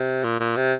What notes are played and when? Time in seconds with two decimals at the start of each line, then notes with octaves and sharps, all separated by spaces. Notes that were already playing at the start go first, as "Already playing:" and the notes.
Already playing: C3
0.24 A#2
0.40 A#2
0.56 C3